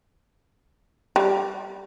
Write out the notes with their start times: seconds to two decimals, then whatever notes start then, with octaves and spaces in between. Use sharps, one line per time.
1.16 G3